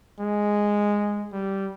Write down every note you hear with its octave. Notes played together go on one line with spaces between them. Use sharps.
G#3
G3